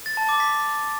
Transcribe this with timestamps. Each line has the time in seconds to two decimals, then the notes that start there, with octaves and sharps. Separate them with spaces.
0.06 A6
0.17 A5
0.29 D6
0.40 B6